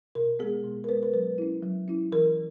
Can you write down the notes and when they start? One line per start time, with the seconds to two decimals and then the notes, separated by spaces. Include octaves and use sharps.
0.15 B2 A#4
0.39 B3 G#4
0.43 G#3
0.64 B2
0.84 A#4
0.89 G#3 B3 B4
1.03 A#4
1.14 F#3 B4
1.38 C#4 E4
1.63 F#3
1.88 C#4 E4
2.12 E3 A#4